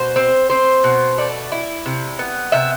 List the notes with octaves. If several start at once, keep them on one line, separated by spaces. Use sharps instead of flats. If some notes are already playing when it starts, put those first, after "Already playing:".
Already playing: B2 C5
C4
C4 C5
B2
A3 D5
E4
C3
B3
C3 E5